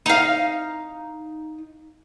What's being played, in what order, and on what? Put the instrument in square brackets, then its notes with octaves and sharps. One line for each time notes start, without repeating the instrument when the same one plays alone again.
[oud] D#4 F5